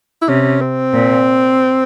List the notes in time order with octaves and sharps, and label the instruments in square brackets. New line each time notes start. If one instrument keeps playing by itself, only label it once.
[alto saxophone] E4
[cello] C3 [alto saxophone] C#4
[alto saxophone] C4
[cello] A#2